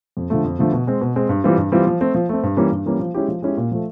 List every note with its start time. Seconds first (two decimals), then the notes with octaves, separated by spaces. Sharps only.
0.17 F2
0.30 D3 F3 A3
0.44 F2
0.59 D3 F3 A3
0.72 B2
0.87 G#3 C4
1.01 B2
1.16 G#3 C4
1.29 G2
1.44 E3 G3 C4 F4
1.57 G2
1.72 E3 G3 C4 F4
1.87 F3
2.01 A3 C4
2.14 F3
2.29 A3 C4
2.43 G2
2.57 E3 G3 A#3 C#4
2.72 G2
2.86 E3 G3 A#3 C#4
3.00 F3
3.14 G#3 C#4 E4 G4
3.28 F3
3.42 G#3 C#4 E4 G4
3.57 A#2
3.71 F3 A3